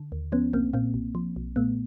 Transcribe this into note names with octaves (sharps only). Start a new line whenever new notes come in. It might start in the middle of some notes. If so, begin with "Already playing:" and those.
Already playing: D3
D#2
F3 B3 C#4
B1 A#3 C4
A#2 A#3 C4
B1
F3
B1
A#2 A3 B3